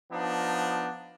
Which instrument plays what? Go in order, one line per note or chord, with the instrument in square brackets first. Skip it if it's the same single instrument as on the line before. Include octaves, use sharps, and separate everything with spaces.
[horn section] F3 B3 D4 D#4